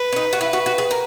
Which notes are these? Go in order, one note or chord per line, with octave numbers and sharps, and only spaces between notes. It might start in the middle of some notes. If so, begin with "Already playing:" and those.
Already playing: B4
C#4
D#4
F#4
E4 B4
F#4
F#4
G#4
A#4